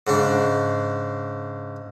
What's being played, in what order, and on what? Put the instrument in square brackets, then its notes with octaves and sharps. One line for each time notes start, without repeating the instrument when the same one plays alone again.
[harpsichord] G#2 C#3 D4